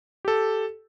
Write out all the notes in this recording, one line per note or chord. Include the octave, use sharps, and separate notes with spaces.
G4 A4